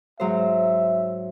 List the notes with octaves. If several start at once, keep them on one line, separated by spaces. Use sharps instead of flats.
G#2 F#3 C5 E5